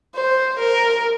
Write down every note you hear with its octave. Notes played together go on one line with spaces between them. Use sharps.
C5
A#4